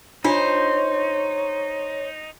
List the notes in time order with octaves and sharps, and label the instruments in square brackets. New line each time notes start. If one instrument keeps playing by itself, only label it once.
[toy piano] D4 F4 G#5 [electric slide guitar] D#4 [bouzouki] C5 [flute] C#5